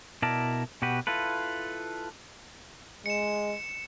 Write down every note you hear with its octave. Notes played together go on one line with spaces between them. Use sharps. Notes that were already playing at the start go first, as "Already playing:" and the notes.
B2 E4 A#4 D5 A5
B2 F#4 G4 B4
E4 F4 A4 B4
G#3 C#7 E7